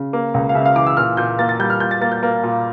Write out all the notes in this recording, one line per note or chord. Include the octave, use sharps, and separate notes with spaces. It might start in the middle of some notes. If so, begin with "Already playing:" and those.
Already playing: C#3
A#3
C#2
F5
C#3 E5
F5
E3 D6
E6
A#2 F6
A#2 G6
A#3 A6
A6
G3 G6
F6
A#2 G6
A6
A#3 A6
G6
A#3
A#2